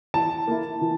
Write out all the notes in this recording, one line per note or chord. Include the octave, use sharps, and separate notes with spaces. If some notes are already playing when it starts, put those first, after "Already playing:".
E3 A5
A#3 E4
E3